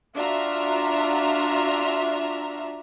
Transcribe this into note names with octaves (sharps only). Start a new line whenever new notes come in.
D4 F4 F#4 E5 A#5